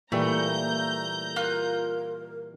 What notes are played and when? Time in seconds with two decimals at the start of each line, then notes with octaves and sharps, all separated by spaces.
0.12 A#2 E3 G3 A3 A#3 A#5 G6
1.36 F4 A#4 F#6